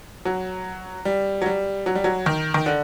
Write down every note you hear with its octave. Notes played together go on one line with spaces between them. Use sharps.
F#3
G3
F#3
G3
F#3
G3
F#3
D#3
D#3
D3